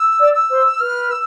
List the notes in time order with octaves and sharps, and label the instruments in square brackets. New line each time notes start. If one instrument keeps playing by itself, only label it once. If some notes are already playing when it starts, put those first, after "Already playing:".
Already playing: [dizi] E6
[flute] D5
[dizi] E6
[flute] C5
[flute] B4 [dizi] F6
[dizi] E6